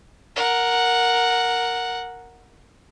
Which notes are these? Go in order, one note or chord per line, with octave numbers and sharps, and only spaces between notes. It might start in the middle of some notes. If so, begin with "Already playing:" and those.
A#4 F#5